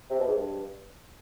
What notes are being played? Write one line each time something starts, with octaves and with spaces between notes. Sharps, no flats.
C3
B2
G#2
G2